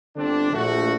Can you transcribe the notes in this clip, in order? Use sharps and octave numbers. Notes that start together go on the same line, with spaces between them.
G1 D3 C4 D4
A#1 A3 F#4